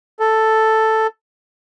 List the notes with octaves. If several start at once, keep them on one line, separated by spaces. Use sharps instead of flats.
A4